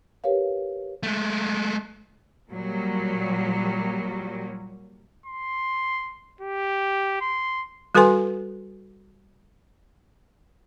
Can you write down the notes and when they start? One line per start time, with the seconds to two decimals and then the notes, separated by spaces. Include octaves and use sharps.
0.24 G4 A#4 B4 C#5 F5
1.03 G#3 A3
2.50 A#2 F#3 G3
5.26 C6
6.41 G4
7.21 C6
7.95 G3 F#4 A4 B4 G#5 C6